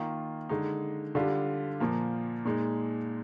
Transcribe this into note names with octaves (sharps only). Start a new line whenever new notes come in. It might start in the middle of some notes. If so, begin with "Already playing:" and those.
Already playing: D#3 A#3 F4
D3 G#3 D#4
D3 G3 D4 F4
A#2 F3 A#3
A#2 G#3 D#4